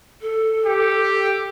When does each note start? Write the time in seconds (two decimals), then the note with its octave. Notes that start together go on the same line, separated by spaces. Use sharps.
0.21 A4
0.66 G4